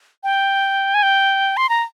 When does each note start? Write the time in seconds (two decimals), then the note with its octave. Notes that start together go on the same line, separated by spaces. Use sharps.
0.24 G5
0.94 G#5
1.03 G5
1.57 C6
1.69 A#5